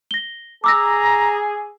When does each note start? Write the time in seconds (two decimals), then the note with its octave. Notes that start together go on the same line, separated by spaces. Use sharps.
0.11 A#6 G7
0.64 G#4 A#5 D6 E6 A#6